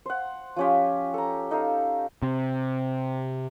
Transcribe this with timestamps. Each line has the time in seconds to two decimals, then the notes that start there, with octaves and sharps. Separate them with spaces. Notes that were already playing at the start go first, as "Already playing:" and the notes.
0.06 C5 F#5
0.56 F3 C#4 G4
1.14 A4 A#5
1.51 D#4 A4 F5
2.22 C3